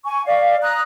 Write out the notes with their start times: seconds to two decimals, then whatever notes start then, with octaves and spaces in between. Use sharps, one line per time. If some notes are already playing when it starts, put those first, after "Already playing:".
0.05 G#5 C#6
0.26 D5 F5
0.62 A#5 D#6 F#6